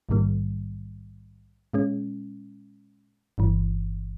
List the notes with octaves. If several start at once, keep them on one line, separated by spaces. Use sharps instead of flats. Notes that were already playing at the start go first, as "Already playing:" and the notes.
A#1 G#2 D#3 G3 A#3
A#2 G#3 C#4
G1 G2 E3